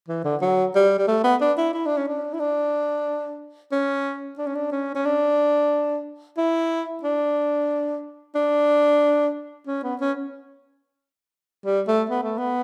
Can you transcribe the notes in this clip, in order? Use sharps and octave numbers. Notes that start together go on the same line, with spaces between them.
E3
D3
F#3
G3
G3
A3
B3
D4
E4
E4
D4
C#4
D4
E4
D4
C#4
D4
C#4
D4
C#4
C#4
D4
E4
D4
D4
C#4
B3
C#4
G3
A3
B3
A3
B3